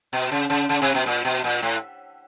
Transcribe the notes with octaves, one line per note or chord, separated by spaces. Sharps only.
B2
C#3
C#3
C#3
C3
B2
A#2
B2
A#2
A2